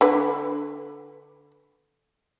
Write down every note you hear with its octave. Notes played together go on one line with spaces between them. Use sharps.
D3 B4